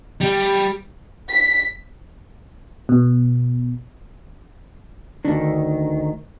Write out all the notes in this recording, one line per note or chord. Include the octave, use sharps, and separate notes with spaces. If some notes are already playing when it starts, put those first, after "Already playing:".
G3
B6
B2
D2 D#3 D4